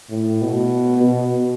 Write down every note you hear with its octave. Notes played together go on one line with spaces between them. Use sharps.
A2
B2
B2